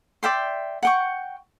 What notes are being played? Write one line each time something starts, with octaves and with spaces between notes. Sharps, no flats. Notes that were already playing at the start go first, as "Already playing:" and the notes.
D5 E5 G5 C6
F#5 G5 C#6